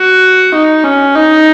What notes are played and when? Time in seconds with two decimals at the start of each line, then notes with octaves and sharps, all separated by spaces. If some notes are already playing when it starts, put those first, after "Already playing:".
Already playing: F#4
0.54 D#4
0.84 C#4
1.15 D#4